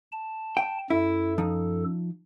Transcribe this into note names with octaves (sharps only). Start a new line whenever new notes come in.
A5
G5
F#2 E4 A4
F3 D#4